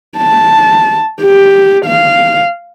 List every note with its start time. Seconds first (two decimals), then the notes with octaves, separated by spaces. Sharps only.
0.17 A5
1.21 G4
1.86 F5